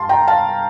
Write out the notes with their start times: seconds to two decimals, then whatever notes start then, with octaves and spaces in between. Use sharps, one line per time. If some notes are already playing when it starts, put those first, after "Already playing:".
Already playing: G2 G3 F5 A5 C6
0.09 G5 A#5
0.28 F5 A5